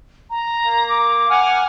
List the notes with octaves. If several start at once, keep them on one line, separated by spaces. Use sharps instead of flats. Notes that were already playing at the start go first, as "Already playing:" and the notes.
A#5
A#3
D6
F#5 G#5 F6